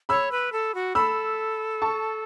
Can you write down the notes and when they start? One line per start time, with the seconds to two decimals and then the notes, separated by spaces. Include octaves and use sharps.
0.09 C#5 B5 E6
0.32 B4
0.52 A4
0.75 F#4
0.95 A4 B5 E6
1.82 A5 C#6